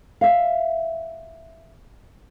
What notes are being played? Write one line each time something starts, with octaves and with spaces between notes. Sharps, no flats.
E5 F5